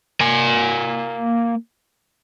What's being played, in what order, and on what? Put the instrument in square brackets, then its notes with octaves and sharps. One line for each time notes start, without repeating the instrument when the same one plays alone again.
[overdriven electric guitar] A#3 G#5